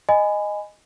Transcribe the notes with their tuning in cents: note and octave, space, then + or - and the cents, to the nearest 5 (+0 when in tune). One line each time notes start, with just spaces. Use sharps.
D#5 -10 G#5 -5 B5 +25